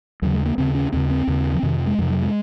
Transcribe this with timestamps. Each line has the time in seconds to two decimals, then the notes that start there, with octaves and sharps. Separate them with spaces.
0.22 D#2 C#3 F#3
0.34 G#3
0.46 A#3
0.58 D#2 C#3 C4
0.75 C#4
0.92 D#2 C#3 C4
1.10 C4
1.27 D#2 C#3
1.55 F3
1.63 F2 C3 D#3
1.87 G#3
1.98 F2 C3 F3
2.10 F#3
2.23 G#3